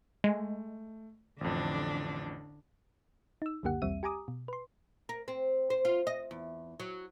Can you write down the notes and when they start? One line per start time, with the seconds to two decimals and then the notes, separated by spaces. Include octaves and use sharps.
0.24 G#3 A3
1.41 A1 F2 D3 D4
3.42 D#4 E6
3.63 C#2 F#2 D3 A#3 G4 F#5
3.82 B1 E2 G3 C4 E5 D#7
4.03 G4 G#5 A#5 D6 D#6
4.28 B2
4.48 B4 C6
5.09 A#4
5.28 C4
5.70 C5
5.85 F4
6.07 D#5
6.31 E2
6.80 F#3